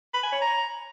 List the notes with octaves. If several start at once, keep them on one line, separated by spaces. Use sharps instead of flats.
B5
G#5
C#5
A#5